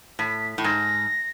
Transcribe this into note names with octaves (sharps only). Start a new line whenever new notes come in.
A2 B6
A2
G#2 A#6